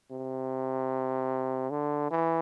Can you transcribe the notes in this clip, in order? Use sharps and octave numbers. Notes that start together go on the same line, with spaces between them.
C3
D3
E3